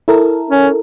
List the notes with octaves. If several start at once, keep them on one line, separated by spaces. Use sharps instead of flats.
E4 A4 A#4
C#4